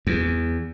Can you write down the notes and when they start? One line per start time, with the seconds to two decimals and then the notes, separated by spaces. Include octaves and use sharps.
0.07 E2